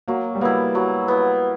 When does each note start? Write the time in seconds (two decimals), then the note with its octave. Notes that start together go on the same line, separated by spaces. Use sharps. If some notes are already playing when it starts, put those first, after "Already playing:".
0.08 F#3 A#3
0.35 G3
0.41 A#3 B3 E4
0.75 F#3
1.08 B3 E4